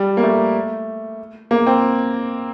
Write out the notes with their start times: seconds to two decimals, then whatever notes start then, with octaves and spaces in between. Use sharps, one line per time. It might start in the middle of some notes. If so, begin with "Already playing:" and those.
Already playing: G3
0.17 A#3
0.23 A3
1.51 A#3
1.67 C4